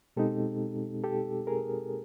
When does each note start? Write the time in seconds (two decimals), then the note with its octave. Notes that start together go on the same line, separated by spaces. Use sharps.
0.16 B2 G#3 C4 D#4 G4 A4
1.04 G4 A4
1.47 G#4 A#4